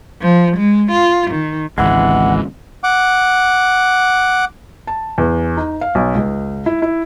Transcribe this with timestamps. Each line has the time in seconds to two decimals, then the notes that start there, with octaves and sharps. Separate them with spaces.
0.22 F3
0.57 G#3
0.91 F4
1.31 D#3
1.78 G#1 C#2 E3 G#3 F#5
2.84 F#5 D6
4.87 A5
5.18 E2
5.57 D#4
5.81 F5
5.95 B1
6.15 C#2
6.66 E4
6.82 E4